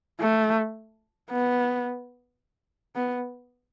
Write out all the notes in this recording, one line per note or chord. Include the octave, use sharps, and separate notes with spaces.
A3
B3
B3